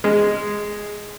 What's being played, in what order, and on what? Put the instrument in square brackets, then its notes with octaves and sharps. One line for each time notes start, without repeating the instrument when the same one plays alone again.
[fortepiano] G#3